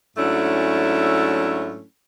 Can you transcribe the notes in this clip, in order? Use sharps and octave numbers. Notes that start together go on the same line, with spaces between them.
G#2 F#3 A3 C#4 D4 E4